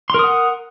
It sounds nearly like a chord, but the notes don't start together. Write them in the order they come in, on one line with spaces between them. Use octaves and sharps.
C6 A#4 D#6 F#5